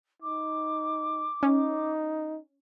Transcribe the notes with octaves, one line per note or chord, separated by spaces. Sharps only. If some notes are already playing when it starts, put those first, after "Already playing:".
D#4 D6
C#4 D#4